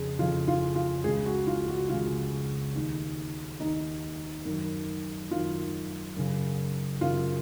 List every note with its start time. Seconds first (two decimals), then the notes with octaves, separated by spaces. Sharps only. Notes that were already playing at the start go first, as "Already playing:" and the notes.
Already playing: F2 C#3 G#4
0.19 F2 C#3 F4
0.48 F4
0.76 F4
1.04 C#2 C#3 G#4
1.26 F#4
1.47 F4
1.68 F#4
1.89 C#2 C#3 F4
2.75 D#2 D#3
3.60 D#2 D#3 D#4
4.46 F#2 D#3
5.31 F#2 D#3 F4
6.17 F#2 C#3
7.01 F#2 C#3 F4